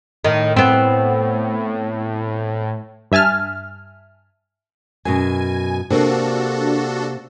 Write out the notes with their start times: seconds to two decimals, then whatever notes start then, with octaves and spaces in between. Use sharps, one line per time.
0.24 A2 D#3
0.57 B3 C4
3.12 G2 E5 G#5 A5 F6
5.05 F#2 B2 G#5
5.90 C3 A#3 D4 F#4 A4